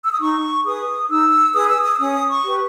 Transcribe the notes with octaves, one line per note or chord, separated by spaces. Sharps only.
E6
D#6
D#4 C#6
G#4 B4 D#6
D#4 E6
G#4 B4 D#6
E6
D#6
E6
C#4 D#6
C#6
G4 B4